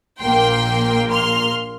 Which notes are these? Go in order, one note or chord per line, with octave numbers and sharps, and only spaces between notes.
A#1 A#2 A#3 G5 C6
C6 F6